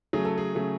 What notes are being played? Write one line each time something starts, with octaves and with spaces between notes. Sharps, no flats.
C#3 F#3 A3 G#4
A4
G#4
C#3 F#3 A3